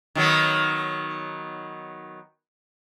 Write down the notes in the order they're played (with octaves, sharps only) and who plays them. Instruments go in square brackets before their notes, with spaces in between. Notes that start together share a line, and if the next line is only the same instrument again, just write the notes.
[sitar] D#3 F#3 B3